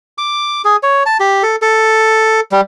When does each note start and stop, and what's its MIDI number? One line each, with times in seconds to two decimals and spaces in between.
0.18 0.62 86
0.65 0.76 68
0.83 1.03 73
1.06 1.17 81
1.20 1.43 67
1.43 1.56 69
1.62 2.40 69
2.52 2.61 55